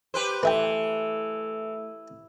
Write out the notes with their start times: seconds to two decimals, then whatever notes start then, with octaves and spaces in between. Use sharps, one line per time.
0.14 G4 B4 C5
0.43 E3 A3 B4 E5 G5